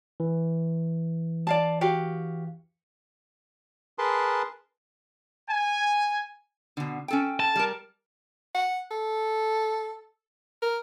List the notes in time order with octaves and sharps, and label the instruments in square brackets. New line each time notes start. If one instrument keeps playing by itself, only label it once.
[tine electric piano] E3
[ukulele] D5 F5 A5
F#4 G4 F5
[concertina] G#4 A#4 B4 A5 C6
[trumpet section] G#5
[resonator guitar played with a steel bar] B2 D3
C#4 A4 G5
[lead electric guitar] A5
[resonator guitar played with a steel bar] G3 A#4
[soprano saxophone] F#5
A4
A#4